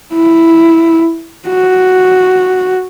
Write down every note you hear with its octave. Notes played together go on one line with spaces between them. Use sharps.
E4
F#4